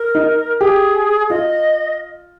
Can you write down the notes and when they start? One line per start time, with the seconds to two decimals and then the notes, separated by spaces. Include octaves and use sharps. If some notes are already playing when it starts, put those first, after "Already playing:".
Already playing: A#4
0.15 D#4
0.61 G4 G#4
1.30 F4 D#5